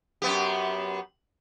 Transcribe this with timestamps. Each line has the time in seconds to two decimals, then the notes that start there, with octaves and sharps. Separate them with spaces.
0.22 F#2 B3 G4